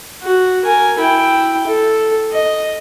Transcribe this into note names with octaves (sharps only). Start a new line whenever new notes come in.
F#4
A#4 G#5
E4 G5
A4
D#5